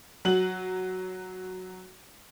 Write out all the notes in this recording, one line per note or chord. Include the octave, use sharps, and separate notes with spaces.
F#3 F#4 F#7